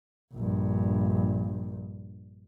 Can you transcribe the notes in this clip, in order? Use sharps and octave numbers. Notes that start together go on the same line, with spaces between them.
A#1 G2